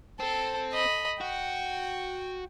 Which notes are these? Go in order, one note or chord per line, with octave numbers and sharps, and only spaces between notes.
C4 A4
D#5 B5
F#4 G5